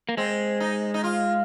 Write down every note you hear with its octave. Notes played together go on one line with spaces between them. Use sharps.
A#3
G#3 C4
D#4
D#4
F4